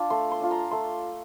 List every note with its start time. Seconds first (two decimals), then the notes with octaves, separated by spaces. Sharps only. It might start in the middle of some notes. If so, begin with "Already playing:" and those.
Already playing: D4 F4 D6
0.10 A3 C6
0.31 C6
0.41 D4 F4
0.51 A#5
0.71 A3 C6